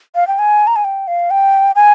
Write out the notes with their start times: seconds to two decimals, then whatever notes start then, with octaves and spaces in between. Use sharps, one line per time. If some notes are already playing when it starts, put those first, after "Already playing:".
0.15 F5
0.28 G5
0.39 G#5
0.67 A#5
0.76 G#5
0.84 G5
1.07 F5
1.31 G5
1.76 G#5